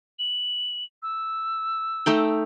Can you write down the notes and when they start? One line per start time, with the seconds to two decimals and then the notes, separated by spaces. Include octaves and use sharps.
0.19 F#7
1.03 E6
2.06 A3 D#4 G5